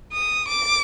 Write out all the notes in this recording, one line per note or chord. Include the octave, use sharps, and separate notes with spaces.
D#6
D6